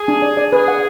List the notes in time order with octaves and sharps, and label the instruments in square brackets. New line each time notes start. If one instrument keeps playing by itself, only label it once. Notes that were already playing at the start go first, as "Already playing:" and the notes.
Already playing: [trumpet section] G#4
[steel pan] D4
D5
D5
[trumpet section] G#4 [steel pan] B4
[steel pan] F#5